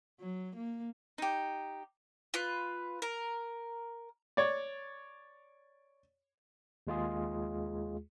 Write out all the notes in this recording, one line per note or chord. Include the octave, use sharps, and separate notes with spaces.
F#3
A#3
D#4 G4
F4 B4
A#4
C#5 D5
D#2 G#3 F4 G#4